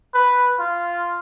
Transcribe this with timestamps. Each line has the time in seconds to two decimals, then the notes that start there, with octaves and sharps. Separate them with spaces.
0.14 B4
0.59 F4